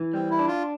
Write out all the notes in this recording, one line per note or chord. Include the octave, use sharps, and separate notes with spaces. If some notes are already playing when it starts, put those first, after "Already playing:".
Already playing: E3
G3 C4
E4
D4
F4